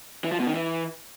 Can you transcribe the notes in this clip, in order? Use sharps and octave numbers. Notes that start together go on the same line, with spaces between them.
E3
F3
B2
D#3
E3